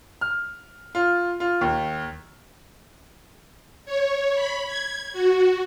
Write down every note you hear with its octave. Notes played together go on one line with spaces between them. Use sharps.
F6
F4
F4
D#2
C#5
B5
G#6
F#4